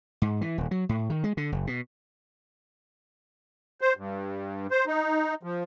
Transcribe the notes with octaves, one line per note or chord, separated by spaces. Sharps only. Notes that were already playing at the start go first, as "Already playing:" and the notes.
G#2
E3
D#1
F#3
A2
D#3
G#3
D3
F#1
B2
C5
G2
C5
D#4
F3